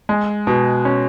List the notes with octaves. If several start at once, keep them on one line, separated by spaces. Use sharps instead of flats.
G#3
B2
C#4